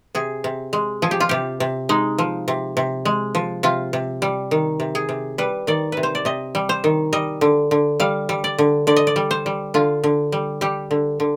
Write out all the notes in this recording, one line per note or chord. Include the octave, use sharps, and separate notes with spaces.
C3 G#4
C3
G#3
F3 G#4
G4
F4
C3 G4
C3
G#3 D#4
F3
C3
C3
G#3
F3
C3 F4
C3
G3
D#3
C3
G#4
C3
G3 B4
D#3 D5
C3 B4
C5
D5
C3 D#5
G3
C5
D#3
G3 D#5
D3
D3
G3 F5
G3
D5
D3
D3 D5
D#5
D5
G3
C5
G3
D3 F4
D3
G3
G3 G4
D3
D3